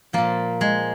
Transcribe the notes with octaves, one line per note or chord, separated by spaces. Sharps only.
A#2 F3 A#3
G#3